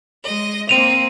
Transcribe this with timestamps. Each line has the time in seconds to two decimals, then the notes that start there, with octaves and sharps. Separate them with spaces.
0.24 G#3 D#5
0.69 A#3 C4 D#7 F7